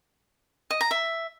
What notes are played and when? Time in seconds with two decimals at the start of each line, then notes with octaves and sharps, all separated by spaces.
0.71 D#5
0.81 A#5
0.91 E5